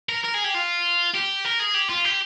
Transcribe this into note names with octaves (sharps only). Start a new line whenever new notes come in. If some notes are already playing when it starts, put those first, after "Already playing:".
A#4
A#4
G#4
G4
F4
G4
A#4
G#4
G4
F4
G4